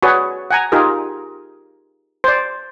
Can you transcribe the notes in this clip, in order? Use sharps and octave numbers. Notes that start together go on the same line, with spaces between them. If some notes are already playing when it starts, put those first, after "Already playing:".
F#4 G#4 B4 C#5 D5
F#5 G#5 A#5
D#4 F4 G4 G#4 A#4
C5 D5